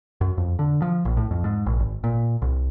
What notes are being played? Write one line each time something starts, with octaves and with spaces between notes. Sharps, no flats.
F#2
F2
D3
F3
A#1
A2
F2
G#2
A#1
G#1
A#2
C2